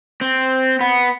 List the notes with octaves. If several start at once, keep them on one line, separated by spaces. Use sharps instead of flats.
C4
B3